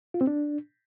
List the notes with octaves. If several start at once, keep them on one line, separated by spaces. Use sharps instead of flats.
F4
C4
D4